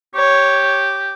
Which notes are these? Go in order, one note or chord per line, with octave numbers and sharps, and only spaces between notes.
G4 C#5